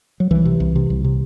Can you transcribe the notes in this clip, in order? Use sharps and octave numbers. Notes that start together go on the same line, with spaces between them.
F#3
C2 E3
C3
C2
C3
C2
C3